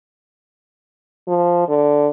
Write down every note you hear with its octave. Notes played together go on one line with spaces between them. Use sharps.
F3
D3